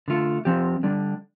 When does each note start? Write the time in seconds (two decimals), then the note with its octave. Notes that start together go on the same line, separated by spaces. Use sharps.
0.08 D3 A3 F4
0.45 F3 C4 G4
0.83 D3 G3 D4